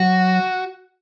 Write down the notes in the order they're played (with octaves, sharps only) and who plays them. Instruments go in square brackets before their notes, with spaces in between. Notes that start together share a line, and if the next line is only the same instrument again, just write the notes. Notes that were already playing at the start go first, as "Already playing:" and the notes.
Already playing: [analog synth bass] F#3 [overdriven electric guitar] F#4